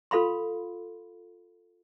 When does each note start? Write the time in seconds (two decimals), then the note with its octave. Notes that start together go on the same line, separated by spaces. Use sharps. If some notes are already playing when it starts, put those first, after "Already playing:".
0.11 F4 A4 F5 B5 C6